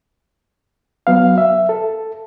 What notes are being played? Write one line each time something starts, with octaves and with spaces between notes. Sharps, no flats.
F#3 B3 F5
E5
A4